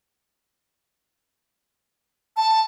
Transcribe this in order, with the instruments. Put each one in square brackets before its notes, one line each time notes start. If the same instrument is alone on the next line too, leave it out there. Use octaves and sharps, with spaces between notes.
[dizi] A5